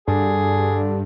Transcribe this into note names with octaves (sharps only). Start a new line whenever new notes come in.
G2 D3 G#4